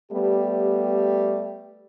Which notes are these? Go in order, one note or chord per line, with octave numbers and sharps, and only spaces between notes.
G3 A3 B3 G4